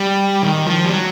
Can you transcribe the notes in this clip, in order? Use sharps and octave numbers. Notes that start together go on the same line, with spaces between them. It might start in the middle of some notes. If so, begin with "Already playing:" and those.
Already playing: G3
D#3
F3
G3
F#3